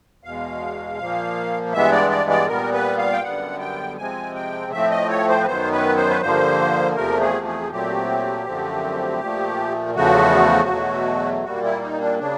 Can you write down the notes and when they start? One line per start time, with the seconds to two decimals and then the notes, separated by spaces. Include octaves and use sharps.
0.24 E2 B2 G#3 F5
0.99 A#2 F3 A#3
1.73 G2 E3 G#3 B3 E5
1.92 D5
2.10 D5
2.30 D5
2.48 A#2 G3 B3 A#4
2.73 B4
2.98 F5
3.13 G5
3.22 F#2 D3 G3 B3 F#5
3.60 G5
3.98 C3 F3 G#3 C4 G#5
4.35 G5
4.72 A2 F3 A3 C4 E5
4.90 D#5
5.09 C#5
5.28 C5
5.42 B4
5.46 F#2 D#3 F#3 B3 C5
5.72 B4
5.96 C5
6.10 B4
6.21 G2 D3 F3 A#3 C5
6.96 E2 C3 F3 A3 A#4
7.21 G#4
7.46 G#4
7.71 A#2 F#3 A3 C4 G4
8.46 F#2 D3 F3 A3 C4
9.20 A#2 F3 A3
9.95 E2 C#3 F3 A3 F#4
10.69 E2 B2 F#3 A3
11.44 A#2 G3 A#3 F#4
11.63 E4
11.82 D#4
12.01 D4
12.19 C#3 F#3 D4